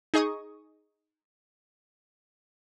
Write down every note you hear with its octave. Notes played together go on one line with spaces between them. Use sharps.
D#4 G#4 D#5 C#6 D#6